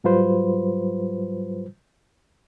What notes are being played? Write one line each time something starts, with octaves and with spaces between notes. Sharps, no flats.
G#2 F#3 G3 F4 B4 C5